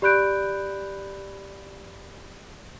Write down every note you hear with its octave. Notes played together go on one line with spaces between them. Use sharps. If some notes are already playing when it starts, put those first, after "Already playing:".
G4 D5 B5 F#6 G6 D7